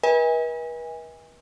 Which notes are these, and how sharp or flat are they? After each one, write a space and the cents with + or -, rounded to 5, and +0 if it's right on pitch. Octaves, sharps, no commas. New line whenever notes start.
B4 -40 D#5 +45 G#5 -25